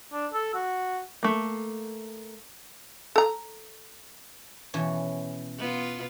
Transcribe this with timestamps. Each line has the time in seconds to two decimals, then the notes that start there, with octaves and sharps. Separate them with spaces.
0.13 D4
0.34 A4
0.54 F#4
1.23 A3 A#3
3.16 A4 A#5
4.74 B2 E3 C#4
5.58 B3 F4